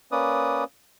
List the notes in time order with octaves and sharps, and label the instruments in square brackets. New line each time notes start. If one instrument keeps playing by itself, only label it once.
[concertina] A#3 C#4 B4 D5 D#6